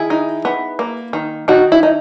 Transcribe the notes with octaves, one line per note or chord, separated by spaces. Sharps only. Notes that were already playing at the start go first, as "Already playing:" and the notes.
Already playing: D#3 E4 G#4
D#4
B3
A#3
D#3
D#3 D#4 F#4
E4
D#4